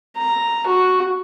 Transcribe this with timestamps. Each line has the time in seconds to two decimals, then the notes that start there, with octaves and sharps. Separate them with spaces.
0.16 A#5
0.67 F#4